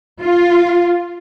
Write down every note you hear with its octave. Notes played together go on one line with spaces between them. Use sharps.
F4